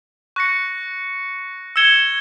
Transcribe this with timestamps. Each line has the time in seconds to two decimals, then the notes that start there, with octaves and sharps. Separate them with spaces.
0.36 C#6 F#6 A#6 C#7
1.76 E6 G#6 C#7 E7 G7